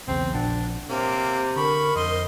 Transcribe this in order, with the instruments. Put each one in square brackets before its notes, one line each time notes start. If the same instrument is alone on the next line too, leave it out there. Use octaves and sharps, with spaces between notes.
[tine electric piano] B1 E2 C#3 [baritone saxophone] C4
[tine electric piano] A#1 F#5 [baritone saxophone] D4
[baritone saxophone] C3 [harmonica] A#3 [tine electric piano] C#5
[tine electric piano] D3 [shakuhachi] A#4 [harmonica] B5 C#6
[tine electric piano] F2 [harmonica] C5 D#5 C6